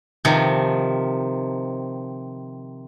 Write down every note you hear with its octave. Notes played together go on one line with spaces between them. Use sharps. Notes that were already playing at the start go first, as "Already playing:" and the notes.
C3 D#3 F3